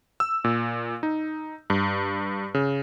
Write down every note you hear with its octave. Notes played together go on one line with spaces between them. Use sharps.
E6
A#2
D#4
G2
C#3